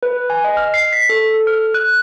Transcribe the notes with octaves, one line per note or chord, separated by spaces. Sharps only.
B4
G#5
D#5
F6
C7
B6
A4
A4
F6
F#6